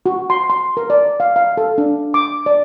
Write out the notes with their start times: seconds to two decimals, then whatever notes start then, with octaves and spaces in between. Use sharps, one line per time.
0.06 F#4
0.30 C6
0.50 C6
0.77 A#4
0.90 D5
1.20 F5
1.36 F5
1.57 A4
1.78 D4
2.14 D6
2.46 D5